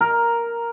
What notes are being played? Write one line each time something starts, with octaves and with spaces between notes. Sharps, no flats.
A#4